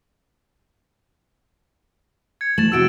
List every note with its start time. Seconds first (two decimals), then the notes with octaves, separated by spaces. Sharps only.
2.41 G#6 C#7
2.58 A3 A6 E7 F#7
2.72 C3 F#4 G4 E6 D7